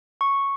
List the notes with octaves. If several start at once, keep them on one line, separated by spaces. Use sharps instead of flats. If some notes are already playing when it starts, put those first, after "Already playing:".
C#6